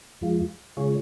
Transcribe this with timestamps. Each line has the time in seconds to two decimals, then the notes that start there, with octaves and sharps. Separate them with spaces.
0.21 F2 F3 G#3 F4
0.77 C#3 G#3 F4 G#4 C#5